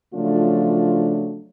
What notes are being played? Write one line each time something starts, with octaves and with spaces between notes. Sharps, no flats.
C#3 F3 F#3 A3 D4 F4